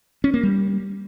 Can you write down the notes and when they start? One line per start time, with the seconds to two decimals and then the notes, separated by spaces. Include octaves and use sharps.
0.24 C#4
0.34 A#3
0.43 G3